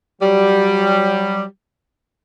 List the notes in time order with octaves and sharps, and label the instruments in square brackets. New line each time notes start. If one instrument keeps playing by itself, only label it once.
[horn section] F#3 G3